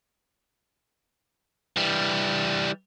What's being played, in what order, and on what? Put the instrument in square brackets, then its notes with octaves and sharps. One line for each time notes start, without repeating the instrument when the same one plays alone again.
[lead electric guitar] E3 G3